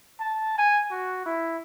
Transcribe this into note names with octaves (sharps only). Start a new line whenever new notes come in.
A5
G#5
F#4
E4